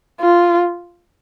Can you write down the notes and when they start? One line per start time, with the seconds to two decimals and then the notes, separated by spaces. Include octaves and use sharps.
0.21 F4